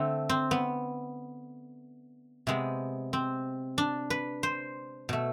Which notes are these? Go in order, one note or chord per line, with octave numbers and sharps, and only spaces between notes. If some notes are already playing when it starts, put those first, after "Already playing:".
Already playing: D3 A3 C4
C4
B3
C3 G#3 B3
C4
D4
B4
C5
B2 A3